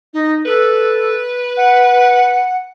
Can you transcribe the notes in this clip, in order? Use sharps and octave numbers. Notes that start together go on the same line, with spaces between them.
D#4
A4 B4
F#5